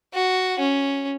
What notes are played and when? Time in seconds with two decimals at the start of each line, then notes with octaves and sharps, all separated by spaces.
0.13 F#4
0.59 C#4